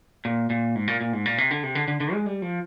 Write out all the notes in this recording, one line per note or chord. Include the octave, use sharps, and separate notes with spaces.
A#2
A#2
G#2
A#2
A#2
G#2
A#2
C3
D3
C3
D3
D3
D3
G#3
G3
F3